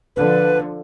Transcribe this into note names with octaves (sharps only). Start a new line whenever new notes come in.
D3 F3 B4